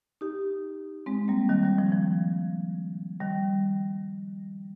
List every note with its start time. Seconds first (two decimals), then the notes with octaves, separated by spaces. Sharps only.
0.21 D#4 G4
1.06 G#3 C4
1.28 G3 A#3
1.49 D#3 G3
1.63 D#3 G3
1.78 F3
1.92 F3
3.20 D#3 G3